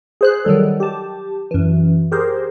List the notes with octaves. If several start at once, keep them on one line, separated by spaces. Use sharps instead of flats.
G#4 C5 F#6
D#3 F#3 G3 A4
G4 A5
F#2 E3
G4 G#4 A#4 C5